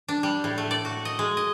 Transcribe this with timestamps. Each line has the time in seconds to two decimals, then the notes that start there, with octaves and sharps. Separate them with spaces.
0.08 D4
0.23 G3
0.44 A2
0.58 A3
0.71 D5
0.85 F#4
1.05 D#5
1.19 G#3
1.37 D#5